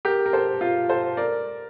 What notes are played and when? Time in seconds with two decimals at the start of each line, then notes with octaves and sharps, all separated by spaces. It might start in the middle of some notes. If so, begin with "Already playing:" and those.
0.05 G4 A#4
0.26 A#4
0.33 A4 C5
0.61 F4
0.89 A4 C5
1.17 A#4 D5